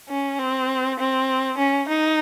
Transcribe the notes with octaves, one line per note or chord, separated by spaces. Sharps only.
C#4
C4
C4
C#4
D#4